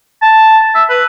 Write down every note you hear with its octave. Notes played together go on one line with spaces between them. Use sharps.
A5
E5
B4